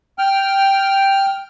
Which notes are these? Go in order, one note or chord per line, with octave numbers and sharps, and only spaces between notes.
G5 F6